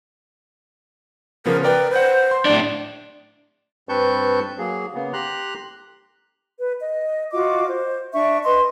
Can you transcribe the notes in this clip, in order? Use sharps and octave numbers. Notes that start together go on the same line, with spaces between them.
C#3 F3 B3 A#4
A#4 B4 D5 G5
B4 C5 F#5
C6
A2 D4 D5
G2 C4 B4 A5 C#6 G6
F#3 A#3 G#4
C#3 A#3 B3
G4 A#5 C6 F#6
B4
D#5
F4 F#4 D#5 D6
C5
D4 E5 C#6
B4 D#5 C6